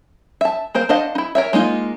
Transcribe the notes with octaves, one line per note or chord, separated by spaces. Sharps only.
E5 A5
A#3 A#4 C5 F5
D4 C5 D#5 F5 F#5
D#4 E4
A#4 C#5 E5
G#3 A#3 D#4 F4